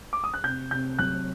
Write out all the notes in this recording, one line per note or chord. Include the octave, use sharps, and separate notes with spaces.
D6
D#6
F#6
C3 G6
C3 G6
F#3 F#6